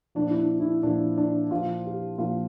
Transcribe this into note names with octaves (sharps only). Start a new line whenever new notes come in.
A#2 F3 D4
E4
D4
E4
A#2 F3 D4
D4
A#2 F3 F4
G4
A#2 F3 F4